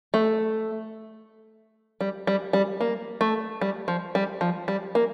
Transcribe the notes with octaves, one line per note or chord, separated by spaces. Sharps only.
A3
G3
G3
G3
A#3
A3
G3
F3
G3
F3
G3
A#3